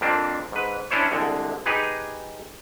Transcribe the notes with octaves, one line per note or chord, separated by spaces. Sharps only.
F2 A#3 C4 D4
G#2 B4
C#4 D4 E4 C5 C#5
C2 D3 G#3
D#4 G4 G#4 B4